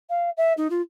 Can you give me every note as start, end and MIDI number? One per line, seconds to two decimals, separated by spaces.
0.10 0.30 77
0.37 0.53 76
0.57 0.70 63
0.70 0.81 65